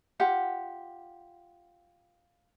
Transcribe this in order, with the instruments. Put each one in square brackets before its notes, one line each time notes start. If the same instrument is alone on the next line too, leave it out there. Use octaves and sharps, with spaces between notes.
[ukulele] F4 G4 F#5